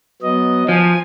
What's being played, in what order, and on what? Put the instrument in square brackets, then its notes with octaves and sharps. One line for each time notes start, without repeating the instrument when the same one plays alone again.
[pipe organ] F#3 B3 D#5
[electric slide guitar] F3 [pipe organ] G#5